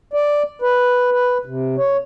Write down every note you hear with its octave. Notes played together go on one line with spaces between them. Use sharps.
D5
B4
B4
C3
C#5